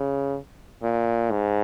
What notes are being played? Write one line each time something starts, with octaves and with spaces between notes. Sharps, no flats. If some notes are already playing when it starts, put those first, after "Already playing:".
Already playing: C#3
A#2
G#2